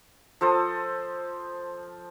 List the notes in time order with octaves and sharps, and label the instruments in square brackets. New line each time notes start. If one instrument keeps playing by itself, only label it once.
[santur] F3 A4 C5 D#6